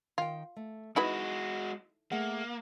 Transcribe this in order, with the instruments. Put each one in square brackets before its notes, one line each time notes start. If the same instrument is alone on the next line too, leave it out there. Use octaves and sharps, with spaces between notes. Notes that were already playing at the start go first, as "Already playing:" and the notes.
[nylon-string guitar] D#3 G5 [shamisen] F4
[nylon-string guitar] A3
[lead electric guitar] G#3 F#4 [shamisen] D#4 E4 B4 [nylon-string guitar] D#5
[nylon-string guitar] A3 G#4 F#5 [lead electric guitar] A#3